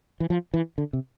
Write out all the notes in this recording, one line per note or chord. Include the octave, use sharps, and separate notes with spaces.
E3
F3
E3
D3
C3